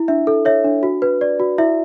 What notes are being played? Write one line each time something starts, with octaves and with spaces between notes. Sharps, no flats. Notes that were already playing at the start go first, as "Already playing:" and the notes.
Already playing: E4
D4 E5
A4
C#5 E5
D4
F#4
B4
D5
F#4
E4 E5